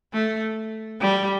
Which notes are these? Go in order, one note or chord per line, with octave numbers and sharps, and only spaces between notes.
A3
G3